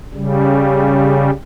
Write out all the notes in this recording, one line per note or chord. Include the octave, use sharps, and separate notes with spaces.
C#3 G3